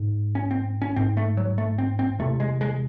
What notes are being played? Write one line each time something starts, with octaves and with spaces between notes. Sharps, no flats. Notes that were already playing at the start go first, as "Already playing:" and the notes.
Already playing: G#2
C#4
C4
C#4
G#2 C4
A3
F#3
A3
C4
C4
E2 C3 A3
G#3
G#3